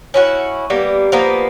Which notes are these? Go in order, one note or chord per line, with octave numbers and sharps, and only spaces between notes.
C#4 E4 F#4
G3 A#3 B3
F3 A#3 B3